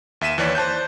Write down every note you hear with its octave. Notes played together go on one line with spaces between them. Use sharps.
D#2 E5 B6 D#7 E7
D#2 E3 C#5 D5 B6
C5 A5 F#6 G6